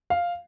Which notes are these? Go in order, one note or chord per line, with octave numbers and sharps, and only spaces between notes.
F5